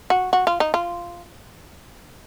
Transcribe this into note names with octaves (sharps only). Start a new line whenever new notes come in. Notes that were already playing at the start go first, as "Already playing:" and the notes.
F#4
F#4
F4
D#4
F4